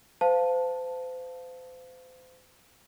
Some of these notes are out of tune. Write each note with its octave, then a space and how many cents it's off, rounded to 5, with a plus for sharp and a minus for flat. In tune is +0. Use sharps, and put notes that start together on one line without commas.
C5 -35 F5 +0 A5 +0